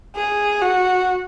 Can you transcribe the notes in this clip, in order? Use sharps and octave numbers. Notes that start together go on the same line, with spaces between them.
G#4
F#4